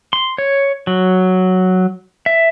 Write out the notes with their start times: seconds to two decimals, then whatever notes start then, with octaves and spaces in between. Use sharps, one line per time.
0.13 C6
0.38 C#5
0.87 F#3
2.26 E5